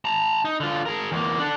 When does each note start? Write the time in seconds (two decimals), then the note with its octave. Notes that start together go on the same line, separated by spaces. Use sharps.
0.05 A5 A#5
0.45 D#4
0.60 D3 F4
0.86 G#4 A#4
1.12 E2 A#3
1.39 D4 A4